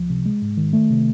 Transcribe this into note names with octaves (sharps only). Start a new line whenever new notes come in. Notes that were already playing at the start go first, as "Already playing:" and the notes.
Already playing: C#2 F3
C3
G#3
G#2
D#3
A3
C3